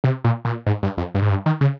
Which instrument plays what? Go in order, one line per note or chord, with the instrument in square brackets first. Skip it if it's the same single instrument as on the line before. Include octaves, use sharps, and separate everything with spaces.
[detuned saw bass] C3
A#2
A#2
G#2
G2
F2
G2
G#2
G2
D#3
C#3